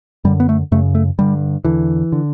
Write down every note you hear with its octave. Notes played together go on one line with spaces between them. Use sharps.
F#2 D3 G3
B3
A3
F#2 C#3 A3
A3
G2 D3 G3
E2 D3 E3
D3